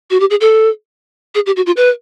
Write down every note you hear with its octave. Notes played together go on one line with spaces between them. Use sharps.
F#4
G4
G#4
A4
G#4
G4
F#4
F4
B4